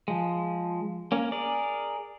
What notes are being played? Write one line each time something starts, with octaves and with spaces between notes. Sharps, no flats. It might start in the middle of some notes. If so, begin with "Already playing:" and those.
F3 G#3
A#3 C#4
G#4 A#4 D5